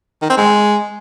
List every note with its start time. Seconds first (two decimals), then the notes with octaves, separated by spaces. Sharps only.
0.22 D#3
0.30 C4
0.37 G#3